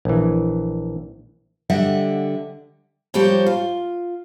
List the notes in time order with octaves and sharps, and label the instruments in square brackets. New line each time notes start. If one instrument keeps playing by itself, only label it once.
[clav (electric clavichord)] A#1 E3
[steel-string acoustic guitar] D3 G3 D#5 E5 F#5
F3 G3 A#3 G4 C5 C#5
F4